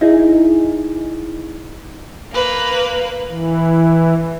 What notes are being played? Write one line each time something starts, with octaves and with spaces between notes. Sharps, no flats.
D#4 E4 G#4
A#3 B4
E3